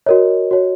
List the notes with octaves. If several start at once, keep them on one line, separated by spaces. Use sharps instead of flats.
F#4 A#4 C#5 D#5
F#4 C#5